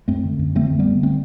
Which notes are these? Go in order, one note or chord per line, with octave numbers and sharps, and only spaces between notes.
F#2 A3 C4
D3
F#2
D3 A3 C4
F#2
G3 B3
D3
A3 C4